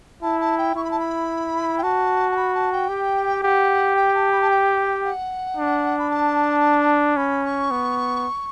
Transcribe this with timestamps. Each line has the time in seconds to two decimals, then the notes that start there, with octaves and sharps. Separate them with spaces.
0.22 E4 A5
0.40 A5
0.58 G5
0.75 E4 C#6
0.84 B5
0.91 A5
1.00 B5
1.78 G5
1.83 F#4 A5
2.31 A5
2.36 B5
2.54 A5
2.72 G5
2.89 G4
3.43 G4 F#5
3.96 G5
4.14 A5
4.32 B5
4.41 A5
4.50 G5
5.04 F#5
5.57 D4
5.98 B5
6.10 A5
7.17 C#4 B5
7.44 C#6
7.71 B3